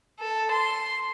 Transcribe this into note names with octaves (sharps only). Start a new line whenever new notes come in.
A4
C6